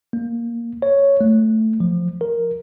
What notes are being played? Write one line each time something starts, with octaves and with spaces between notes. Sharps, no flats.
A#3
C#5
A3
F3
A#4